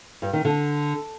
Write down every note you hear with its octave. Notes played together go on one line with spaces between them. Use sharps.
G2
D#3
D3